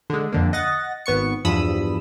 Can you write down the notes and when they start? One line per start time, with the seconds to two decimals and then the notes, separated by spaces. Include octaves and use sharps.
0.10 D3 G#3
0.32 F2 D3 A#3
0.53 D#5 F#5 A6 A#6
1.06 G#1 B3 C#6 C#7
1.45 E2 G2 F3 B5 D#6 E6